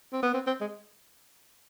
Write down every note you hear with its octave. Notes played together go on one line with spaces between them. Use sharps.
C4
B3
C4
C4
G#3